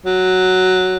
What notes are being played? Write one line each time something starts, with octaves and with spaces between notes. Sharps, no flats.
F#3